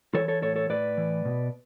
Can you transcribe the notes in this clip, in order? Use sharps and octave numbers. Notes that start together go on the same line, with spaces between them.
E3 A4 C#5
A4 C#5
A2 A4 C#5
A4 C#5
A2 B4 D5
E3
B2